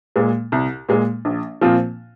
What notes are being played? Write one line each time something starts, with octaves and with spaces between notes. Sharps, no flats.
A#2 G#3
C2
A#2 G#3
A#1
A#2 F3 C4 F4